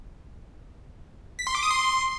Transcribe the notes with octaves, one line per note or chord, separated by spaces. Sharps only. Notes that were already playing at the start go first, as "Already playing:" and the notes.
B6
C6
D6
D#6
C6